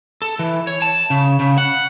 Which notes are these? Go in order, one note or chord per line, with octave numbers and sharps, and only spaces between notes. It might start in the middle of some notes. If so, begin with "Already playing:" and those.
A4
E3
C#5
A5
C#3
C#3
F#5